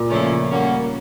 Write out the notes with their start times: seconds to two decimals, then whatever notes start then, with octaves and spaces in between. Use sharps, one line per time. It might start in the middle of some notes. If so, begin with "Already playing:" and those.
Already playing: A#2
0.10 C#3 F3 A3 C#4 E4
0.51 G3 A#3 C#4 F#4